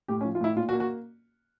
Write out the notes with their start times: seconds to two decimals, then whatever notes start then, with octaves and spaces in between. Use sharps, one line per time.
0.08 A2 G4
0.21 C#4
0.25 F3
0.35 F4
0.41 A2 E4
0.56 A#2 F4
0.69 F#4
0.73 A#3
0.80 F#4